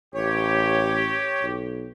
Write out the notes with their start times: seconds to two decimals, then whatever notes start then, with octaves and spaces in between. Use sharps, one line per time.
0.15 A1 G4 C#5
1.43 B1